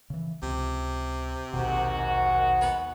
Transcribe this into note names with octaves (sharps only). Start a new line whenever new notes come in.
C#3 E3
C#2 C3
A#1 D#2 G#2 B2 D#3 F#4
B3